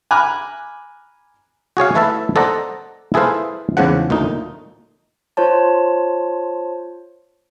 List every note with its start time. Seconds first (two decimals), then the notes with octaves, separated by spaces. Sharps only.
0.11 G#5 A#5 B5 D6 F6 F#6
1.77 F#4 G#4 C#5 F5
1.95 A3 E4 A4 B4 E5 A5
2.36 A4 C5 D5 D#5 F#5 A#5
3.14 E4 G#4 A4 B4 C5 F5
3.77 E2 G#2 C#3 F3 F#5
4.10 D2 A#2 A3 D#4
5.37 F4 C5 C#5 A5